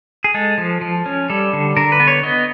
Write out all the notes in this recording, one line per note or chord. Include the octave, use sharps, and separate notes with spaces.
G#4
G#3 A4
F3
F3
C#4
G3 A4
D3
D3 A#4
B4
B3
C#5
B3 D#5